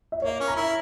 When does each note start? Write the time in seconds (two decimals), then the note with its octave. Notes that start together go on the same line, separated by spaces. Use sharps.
0.12 E5
0.22 A#3 C#5
0.40 C#4
0.48 A#5
0.56 E4